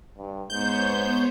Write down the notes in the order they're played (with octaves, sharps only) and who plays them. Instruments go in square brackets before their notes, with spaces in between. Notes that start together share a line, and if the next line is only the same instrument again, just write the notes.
[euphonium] G2
[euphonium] G#2 [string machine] B3 C5 C#5 [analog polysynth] G6